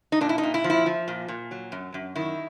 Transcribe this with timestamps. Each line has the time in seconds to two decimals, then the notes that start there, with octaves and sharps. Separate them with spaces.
0.12 D#4
0.21 A#2 D4
0.29 E4
0.38 D#4
0.43 A#2
0.54 E4
0.64 F3
0.70 E4
0.86 F3
1.08 A#2
1.28 A#2
1.51 F#3
1.72 F#2
1.94 F#2
2.16 D#3 E4